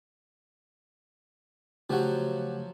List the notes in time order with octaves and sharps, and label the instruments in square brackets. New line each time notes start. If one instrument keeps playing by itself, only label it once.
[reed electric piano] C#3 A3 [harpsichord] F3 F#3 [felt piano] G4 F#5